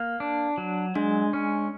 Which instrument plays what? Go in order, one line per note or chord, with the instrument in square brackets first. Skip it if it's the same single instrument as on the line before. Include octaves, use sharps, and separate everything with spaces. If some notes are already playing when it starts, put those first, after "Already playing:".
Already playing: [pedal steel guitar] A#3
D4
F#3
[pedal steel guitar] G#3 [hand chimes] D4
[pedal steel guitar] C#4